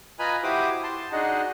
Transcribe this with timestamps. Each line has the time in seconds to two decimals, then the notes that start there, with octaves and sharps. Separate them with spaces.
0.19 F4 B4 D#5 G#5 A#5 B5
0.43 E4 F#4 G4 C5 D6 D#6
0.83 A5 C6
1.12 D4 D#4 F#4 G#4 D#5 F#5